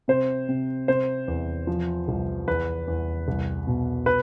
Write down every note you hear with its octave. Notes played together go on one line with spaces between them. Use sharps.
C3 C5
C3
C3 C5
E2
F3
C2
E2 B4
E2
C2
B2
B4